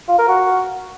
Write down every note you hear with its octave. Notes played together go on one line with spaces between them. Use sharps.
F4
A#4
F#4